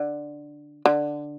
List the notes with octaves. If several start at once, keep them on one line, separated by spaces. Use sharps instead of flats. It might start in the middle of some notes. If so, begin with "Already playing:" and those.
Already playing: D3
D3